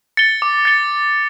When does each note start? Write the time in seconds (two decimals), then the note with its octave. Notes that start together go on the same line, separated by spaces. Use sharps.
0.17 A6 C#7 G7
0.42 D6
0.65 A6 C#7 G7